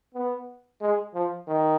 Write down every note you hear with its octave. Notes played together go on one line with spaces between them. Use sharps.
B3
G#3
F3
D#3